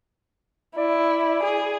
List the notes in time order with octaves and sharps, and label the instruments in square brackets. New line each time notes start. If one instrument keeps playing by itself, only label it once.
[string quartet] E4 [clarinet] D5
[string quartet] G#4